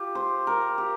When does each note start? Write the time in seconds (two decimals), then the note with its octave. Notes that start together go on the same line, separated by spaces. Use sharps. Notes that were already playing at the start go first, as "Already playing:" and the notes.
Already playing: F4 G4
0.15 C5
0.47 A#4
0.78 G4